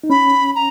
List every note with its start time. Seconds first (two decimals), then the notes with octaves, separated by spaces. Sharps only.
0.04 D#4
0.10 C#4 B5
0.55 A#5